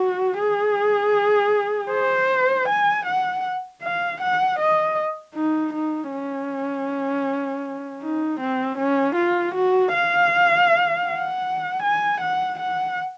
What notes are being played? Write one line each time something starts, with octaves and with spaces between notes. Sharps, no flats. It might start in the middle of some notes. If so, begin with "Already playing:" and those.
Already playing: F#4
G#4
C5
G#5
F#5
F5
F#5
D#5
D#4
D#4
C#4
D#4
C4
C#4
F4
F#4
F5
F#5
G#5
F#5
F#5